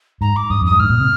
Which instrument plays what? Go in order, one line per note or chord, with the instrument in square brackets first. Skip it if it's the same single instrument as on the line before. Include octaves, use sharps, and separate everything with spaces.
[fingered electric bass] G#2 [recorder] A#5
[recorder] D6
[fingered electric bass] G2 [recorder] D#6
[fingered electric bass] F2
[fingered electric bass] G2 [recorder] D#6
[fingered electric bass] G#2 [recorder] F6
[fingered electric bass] A#2
C3